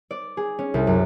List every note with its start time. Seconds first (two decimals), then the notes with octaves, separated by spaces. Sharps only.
0.11 D5
0.37 G#4
0.59 C#4
0.74 C2
0.87 F#2